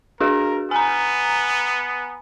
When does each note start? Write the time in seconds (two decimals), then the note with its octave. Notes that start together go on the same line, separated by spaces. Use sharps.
0.20 D4 F#4 G#4 A#4
0.71 B3 G#5 A#5